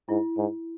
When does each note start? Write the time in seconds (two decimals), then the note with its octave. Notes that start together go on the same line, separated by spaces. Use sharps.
0.09 G#2 E4
0.37 G#2